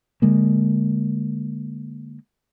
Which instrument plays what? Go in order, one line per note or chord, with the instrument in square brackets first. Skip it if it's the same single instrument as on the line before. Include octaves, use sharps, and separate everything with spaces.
[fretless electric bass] D3 G#3 A#3